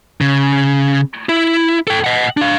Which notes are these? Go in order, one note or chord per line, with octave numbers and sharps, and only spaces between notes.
C#3
E4
A4 G5
D#5 F#5
D4 F5